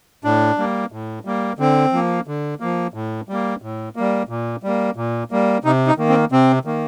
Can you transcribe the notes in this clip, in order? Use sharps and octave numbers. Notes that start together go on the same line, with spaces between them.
A2 D4
G3 A#3
A2
G3 A#3
D3 C4
F3 A#3
D3
F3 A#3
A2
G3 A#3
A2
G3 A#3
A#2
G3 A#3
A#2
G3 A#3
C3 D#4
D#4
D#3 A#3
C4
C3 C4
D#3 A#3